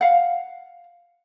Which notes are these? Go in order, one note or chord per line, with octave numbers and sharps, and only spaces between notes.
F5 F#5